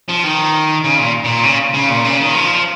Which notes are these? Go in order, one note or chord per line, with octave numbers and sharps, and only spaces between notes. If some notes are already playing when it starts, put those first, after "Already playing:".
F3
D#3
C#3
A#2
A#2
C#3
C#3
A#2
C#3
D#3
F3